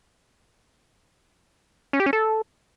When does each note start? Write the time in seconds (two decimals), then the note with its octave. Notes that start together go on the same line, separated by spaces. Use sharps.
1.93 C#4
2.00 G4
2.06 C#4
2.13 A4